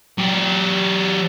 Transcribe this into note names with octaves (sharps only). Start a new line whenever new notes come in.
F#3 G4